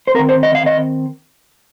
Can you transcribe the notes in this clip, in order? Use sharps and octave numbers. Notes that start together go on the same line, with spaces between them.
C5
D#3 C4 A#4
C5
D#5
F5
D#5